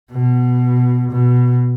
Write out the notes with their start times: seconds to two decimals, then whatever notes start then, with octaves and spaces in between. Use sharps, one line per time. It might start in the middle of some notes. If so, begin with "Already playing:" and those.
0.12 B2
1.11 B2